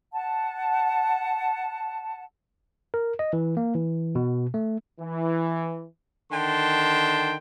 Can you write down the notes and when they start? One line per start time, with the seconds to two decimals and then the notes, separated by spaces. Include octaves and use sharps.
0.13 F#5 A5
2.94 A#4
3.19 D#5
3.33 E3
3.57 A#3
3.75 E3
4.15 B2
4.54 A3
5.00 E3
6.32 D3 D#3 G5 A5 C6